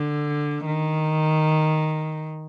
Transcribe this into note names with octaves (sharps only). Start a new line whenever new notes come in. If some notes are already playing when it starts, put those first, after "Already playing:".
Already playing: D3
D#3